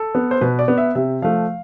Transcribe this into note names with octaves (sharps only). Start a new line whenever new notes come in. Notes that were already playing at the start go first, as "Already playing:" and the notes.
Already playing: A4
B3
C5
B2 B4
D5
B3
E5
C3 E5
F3 A3 F5